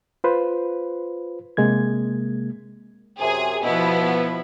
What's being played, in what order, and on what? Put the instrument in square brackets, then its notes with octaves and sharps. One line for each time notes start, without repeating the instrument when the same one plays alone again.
[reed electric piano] F4 B4 C5
C3 G#3 A#3 G#6
[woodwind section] F#2 C3 [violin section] G#4
[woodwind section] B2 [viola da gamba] F3 E4 [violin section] B3